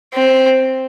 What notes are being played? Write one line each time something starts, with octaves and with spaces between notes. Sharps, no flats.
C4